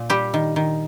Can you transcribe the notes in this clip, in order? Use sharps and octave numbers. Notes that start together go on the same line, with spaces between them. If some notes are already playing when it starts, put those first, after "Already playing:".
Already playing: A#2
G3 G4
D#3
D#3